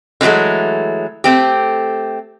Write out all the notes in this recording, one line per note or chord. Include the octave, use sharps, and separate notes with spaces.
D3 E3 F#3 G#3 A3
A3 C4 G4